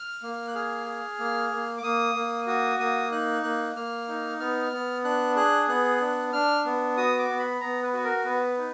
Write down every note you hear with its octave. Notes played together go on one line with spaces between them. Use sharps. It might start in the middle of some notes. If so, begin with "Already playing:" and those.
Already playing: F6
A#3
F#6
G#4 F6
G#4
A#3
A#3
D6
A#3 D#6
A#3
F#4 D#6
A#3 D#6
D#4 F#6
A#3 F#6
A#3 F6
D#4
B3 F6
B3
D4 F#6
G#4 F#6
B3 F#6
D4
D4 F6
B3
F#4 D#6
D6
B3
B5
B3 A#5
B4
F#4 B4
A#4
B3 B4
D#4